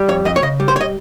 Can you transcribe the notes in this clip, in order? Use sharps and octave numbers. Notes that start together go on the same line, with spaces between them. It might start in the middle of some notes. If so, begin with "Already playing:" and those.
Already playing: G3
F2 C#5
F2 D#5
C#5
C#3 D#5
G3
C5
C#5
D#5